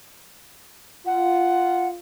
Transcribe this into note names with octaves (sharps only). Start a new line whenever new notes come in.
F4 F#5